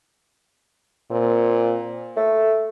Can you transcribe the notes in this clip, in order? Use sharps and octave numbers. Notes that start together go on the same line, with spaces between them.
A#2 C4
A3 A4